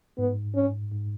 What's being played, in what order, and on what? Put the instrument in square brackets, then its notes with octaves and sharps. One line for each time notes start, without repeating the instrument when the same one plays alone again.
[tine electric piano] G#2 [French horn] B3
[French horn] C#4
[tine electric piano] G#2